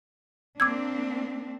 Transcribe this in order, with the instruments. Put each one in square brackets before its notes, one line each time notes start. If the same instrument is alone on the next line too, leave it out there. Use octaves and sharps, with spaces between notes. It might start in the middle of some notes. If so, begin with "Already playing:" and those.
[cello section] A#3 C4 D4 [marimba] D6 E6 G#6